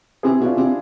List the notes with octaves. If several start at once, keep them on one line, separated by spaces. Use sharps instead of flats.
C3 E4 G#4
B2
D4 F4
C3